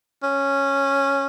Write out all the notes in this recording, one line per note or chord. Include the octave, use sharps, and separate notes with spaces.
C#4